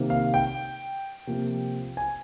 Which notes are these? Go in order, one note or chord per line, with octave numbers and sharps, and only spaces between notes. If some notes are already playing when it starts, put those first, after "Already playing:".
Already playing: C3 D#3 A#3
F5
G5
C3 F3 A#3
G#5